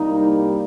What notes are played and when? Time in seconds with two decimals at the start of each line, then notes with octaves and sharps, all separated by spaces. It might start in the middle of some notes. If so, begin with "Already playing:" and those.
Already playing: C2 C3 G3 A#3 D#4